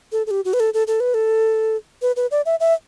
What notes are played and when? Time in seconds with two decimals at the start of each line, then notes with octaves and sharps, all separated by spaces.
0.12 A4
0.27 A4
0.31 G4
0.45 F#4
0.53 B4
0.60 A4
0.74 A4
0.87 A4
1.00 B4
1.14 A4
2.02 B4
2.16 B4
2.31 D5
2.46 E5
2.60 E5